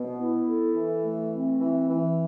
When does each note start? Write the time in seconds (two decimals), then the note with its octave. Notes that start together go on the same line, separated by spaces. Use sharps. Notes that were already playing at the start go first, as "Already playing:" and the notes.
Already playing: B2 B3
0.17 E4
0.45 A4
0.73 E3
1.02 A3
1.31 C4
1.60 E3
1.88 E3